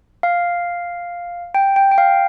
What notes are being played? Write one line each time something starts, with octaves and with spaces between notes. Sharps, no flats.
F5
G5
G5
G5
F5